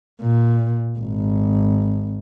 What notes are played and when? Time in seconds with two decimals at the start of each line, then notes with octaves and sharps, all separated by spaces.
0.22 A#2
0.98 G#1